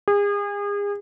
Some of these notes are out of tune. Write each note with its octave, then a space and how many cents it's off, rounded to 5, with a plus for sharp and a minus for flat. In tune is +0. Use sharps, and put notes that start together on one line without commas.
G#4 -35